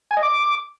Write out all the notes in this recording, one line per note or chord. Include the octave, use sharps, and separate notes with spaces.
G#5
D#5
D6